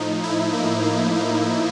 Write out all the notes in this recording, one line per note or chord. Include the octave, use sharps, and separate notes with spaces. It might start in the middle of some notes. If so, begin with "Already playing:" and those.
Already playing: A2 F3 D#4
E4
A#3
A#3
A#3